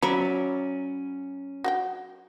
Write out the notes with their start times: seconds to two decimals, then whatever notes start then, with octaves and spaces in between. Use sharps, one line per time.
0.02 F#3 C#4 D5 E5 A#5 B5
1.64 F#4 F#5 G5